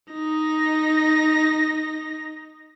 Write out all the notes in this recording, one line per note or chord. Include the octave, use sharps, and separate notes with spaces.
D#4 A#6